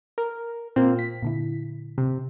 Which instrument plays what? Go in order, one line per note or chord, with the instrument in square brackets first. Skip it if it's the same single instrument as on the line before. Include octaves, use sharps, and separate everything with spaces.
[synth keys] A#4
[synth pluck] A#2 F4 [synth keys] A#3 C4
[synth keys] B6
[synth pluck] A#2 D3 E4
[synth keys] C3